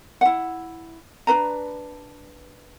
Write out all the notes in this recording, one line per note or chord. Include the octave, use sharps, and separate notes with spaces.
E4 F#5
D4 D#4 B4 A#5